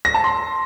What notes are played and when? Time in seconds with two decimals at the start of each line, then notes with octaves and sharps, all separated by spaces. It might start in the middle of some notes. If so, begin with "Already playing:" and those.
0.05 A#6
0.14 A5
0.24 C6